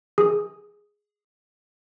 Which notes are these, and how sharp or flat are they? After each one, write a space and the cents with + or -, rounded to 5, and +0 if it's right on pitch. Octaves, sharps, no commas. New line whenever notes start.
G#4 +0 D#6 +0